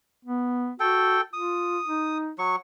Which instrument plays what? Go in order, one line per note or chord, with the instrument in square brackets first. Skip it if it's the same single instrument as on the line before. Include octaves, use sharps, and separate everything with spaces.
[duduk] B3
[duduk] F#4 [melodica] A4 G5
[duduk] F4 [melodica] D#6
[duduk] D#4
[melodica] F#3 C#6